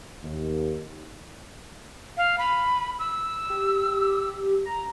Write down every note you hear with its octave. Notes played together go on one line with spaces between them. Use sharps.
D#2
F5
B5
E6
G4
A#5